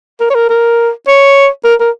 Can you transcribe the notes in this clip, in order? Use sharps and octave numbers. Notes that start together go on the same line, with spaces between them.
A#4
C#5
A#4
A#4
C#5
A#4
A#4